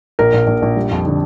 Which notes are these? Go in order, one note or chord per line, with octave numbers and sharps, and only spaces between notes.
A#1 A#4
A#1
A#1
A#1
G3
F2
D3